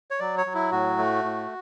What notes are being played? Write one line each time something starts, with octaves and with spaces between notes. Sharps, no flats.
C#5
F#3 D5
C#5
F#3
E4
A2 F#4
A3
A2